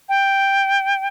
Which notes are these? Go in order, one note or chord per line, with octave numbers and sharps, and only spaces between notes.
G5